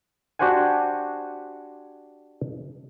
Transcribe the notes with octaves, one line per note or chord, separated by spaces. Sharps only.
D4 F#4 G4 C5 F#5 G#5